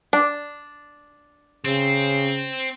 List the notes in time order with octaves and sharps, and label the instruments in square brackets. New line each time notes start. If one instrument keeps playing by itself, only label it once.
[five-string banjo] D4
[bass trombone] C#3 [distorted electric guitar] C4